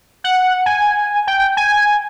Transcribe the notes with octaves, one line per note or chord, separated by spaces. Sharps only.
F#5
G#5
G5
G#5